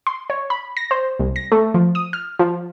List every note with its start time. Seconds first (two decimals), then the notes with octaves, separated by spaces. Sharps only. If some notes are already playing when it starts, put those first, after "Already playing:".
0.07 C6
0.30 C#5
0.50 B5
0.77 A#6
0.91 C5
1.20 C2
1.36 A#6
1.52 A3
1.74 F3
1.95 D#6
2.13 F6
2.39 F3